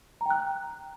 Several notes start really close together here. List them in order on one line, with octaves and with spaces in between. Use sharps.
A#5 G5 F#6